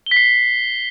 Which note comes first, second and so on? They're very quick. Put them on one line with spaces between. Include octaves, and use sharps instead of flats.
G7 B6 C7